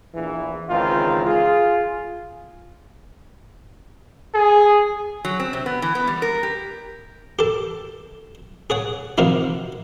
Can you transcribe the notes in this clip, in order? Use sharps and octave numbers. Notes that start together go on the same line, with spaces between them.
A#1 E2 E3
C#2 D#3 E3 G#3 C4 F4
F4 G#4
G#4
F#3
C4
C3
B3
E3
B3
G3
A#4
G4
G4 A4
G#4 C#5 F#5
C3 D#3 F3 D#4 F#4